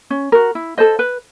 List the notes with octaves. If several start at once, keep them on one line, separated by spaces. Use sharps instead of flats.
C#4
F#4 A#4
E4
A4 C5 D#5
B4